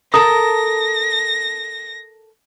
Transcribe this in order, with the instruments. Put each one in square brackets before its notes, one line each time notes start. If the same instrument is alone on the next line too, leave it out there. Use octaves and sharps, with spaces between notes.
[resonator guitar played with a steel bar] A4 A#4 [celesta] D#6 [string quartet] A#6